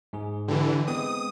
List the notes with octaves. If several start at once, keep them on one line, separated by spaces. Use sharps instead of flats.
G#2 G#4
D3 E3 D4 G4
G#3 B3 C4 D#6